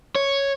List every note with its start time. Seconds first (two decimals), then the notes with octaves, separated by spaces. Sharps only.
0.15 C#5